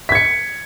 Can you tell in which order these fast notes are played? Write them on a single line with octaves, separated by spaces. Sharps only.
B6 G#6 C#7